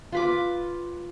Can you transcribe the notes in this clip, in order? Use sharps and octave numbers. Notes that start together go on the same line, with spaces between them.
F4 B4 D6